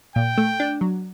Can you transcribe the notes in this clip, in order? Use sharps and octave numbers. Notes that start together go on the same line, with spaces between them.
A#2 G5
A3
D4
F#3